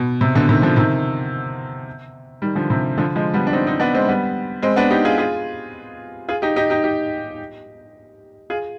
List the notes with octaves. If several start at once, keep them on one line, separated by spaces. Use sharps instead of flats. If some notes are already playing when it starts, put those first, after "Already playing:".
Already playing: B2
C3
B2 D3
C3 D#3
D3 F3
C3 D#3
D#3 G3
D3 F3
C3
D3 F3
F3 G#3
G3 B3
D4
C4 D#4
C4 D#4
B3 D4
G#3 C4
G3 B3
G#3 C4
B3 D4
D#4 G4
F4 G#4
F4 G#4
F4 G#4
D#4 G4
D#4 G4
D#4 G4
D#4 G4
F4 G#4